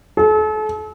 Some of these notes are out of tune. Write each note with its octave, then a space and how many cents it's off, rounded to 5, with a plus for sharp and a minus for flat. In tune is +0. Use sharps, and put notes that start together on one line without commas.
A4 -40